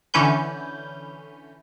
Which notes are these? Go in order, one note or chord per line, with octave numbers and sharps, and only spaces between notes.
D3 E3 C#4 B4 G6